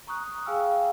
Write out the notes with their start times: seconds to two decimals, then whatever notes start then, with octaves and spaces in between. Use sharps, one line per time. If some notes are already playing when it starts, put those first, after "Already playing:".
0.07 A#5 C#6 D#6 F#6
0.46 G#4 F5 G5 G#5 E6 F6